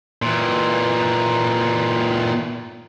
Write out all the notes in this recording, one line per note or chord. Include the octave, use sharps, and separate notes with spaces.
A#2 E3